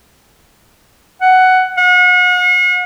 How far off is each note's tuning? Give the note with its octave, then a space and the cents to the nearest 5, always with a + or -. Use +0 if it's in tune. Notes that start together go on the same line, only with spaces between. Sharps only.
F#5 +10
F#5 -40